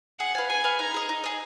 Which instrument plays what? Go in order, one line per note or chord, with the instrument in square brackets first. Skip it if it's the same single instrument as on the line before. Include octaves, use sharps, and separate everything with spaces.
[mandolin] G#4 [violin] F#5
[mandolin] B4 F5 G#5
[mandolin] G#4 [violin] G#5
[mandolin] B4 F5 G#5
[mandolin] D#4 [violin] A#5
[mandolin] G#4 D#5
D#4
G#4 D#5